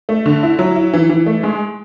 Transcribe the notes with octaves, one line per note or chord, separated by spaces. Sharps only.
A3
D3
E4
F#3
E4
E3
E3
A3
G#3